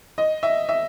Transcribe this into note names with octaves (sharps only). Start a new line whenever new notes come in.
D#5
E5
E5